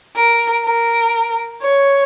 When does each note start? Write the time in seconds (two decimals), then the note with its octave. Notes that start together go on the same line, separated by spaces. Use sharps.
0.16 A#4
0.65 A#4
1.62 C#5